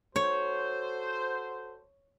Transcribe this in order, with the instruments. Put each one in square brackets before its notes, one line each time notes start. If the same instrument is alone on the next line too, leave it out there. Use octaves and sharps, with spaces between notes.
[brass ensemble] F#4 A4 C5 [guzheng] C#5